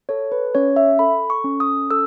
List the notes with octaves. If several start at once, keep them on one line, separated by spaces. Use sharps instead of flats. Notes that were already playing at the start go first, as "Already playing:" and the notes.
A4 C#5
B4
C#4 C#5
E5
A4 B5
C#6
C#4
D#6
A4 E6